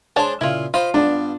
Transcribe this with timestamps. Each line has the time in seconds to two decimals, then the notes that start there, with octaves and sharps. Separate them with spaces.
0.16 G#3 D4 C5 C#5 A5
0.41 A#2 C#3 E4 F4
0.74 F4 C5 D#5 B5
0.94 G2 B3 D4